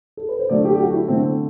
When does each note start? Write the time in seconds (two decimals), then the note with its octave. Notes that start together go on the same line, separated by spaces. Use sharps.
0.17 A4
0.29 B4
0.39 C5
0.50 D3 F#3 A3 D5
0.59 F#4
0.65 G4
0.75 G4
0.80 F#4
0.94 E4
1.08 D3 A3 C4